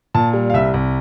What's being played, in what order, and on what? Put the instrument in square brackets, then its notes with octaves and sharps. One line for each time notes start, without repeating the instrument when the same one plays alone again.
[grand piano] A#2 A5
G3
F5
C2 E5
C2